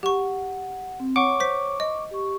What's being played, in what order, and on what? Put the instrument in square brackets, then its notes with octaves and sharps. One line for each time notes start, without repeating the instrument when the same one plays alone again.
[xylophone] G4 C#6 [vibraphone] F#5
[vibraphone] C4
[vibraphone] C#5 [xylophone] F#5 [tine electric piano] C#6 D6
[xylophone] C5 B6
D#5
[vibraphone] G4 C#6